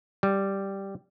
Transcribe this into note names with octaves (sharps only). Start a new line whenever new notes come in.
G3